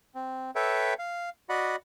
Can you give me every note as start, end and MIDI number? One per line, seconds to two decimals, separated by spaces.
0.15 0.51 60
0.55 0.94 69
0.55 0.94 71
0.55 0.94 73
0.55 0.94 76
0.55 0.94 79
0.99 1.30 77
1.49 1.76 66
1.49 1.76 74
1.49 1.76 75
1.49 1.76 78
1.49 1.76 83